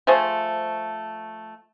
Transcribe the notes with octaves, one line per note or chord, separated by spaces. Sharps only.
F3 A3 G#4 C5